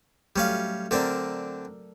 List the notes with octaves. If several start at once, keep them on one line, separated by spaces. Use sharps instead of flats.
F#3 G3 A3 C#4 F5
D3 C4 D4 A4 A#4 D5